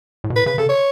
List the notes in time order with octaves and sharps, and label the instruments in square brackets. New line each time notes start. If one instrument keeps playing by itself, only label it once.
[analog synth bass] A2
B2
[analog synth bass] A2 [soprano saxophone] B4
[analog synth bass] C#3 [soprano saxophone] B4
[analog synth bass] C#3 [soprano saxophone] A4
[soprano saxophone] C#5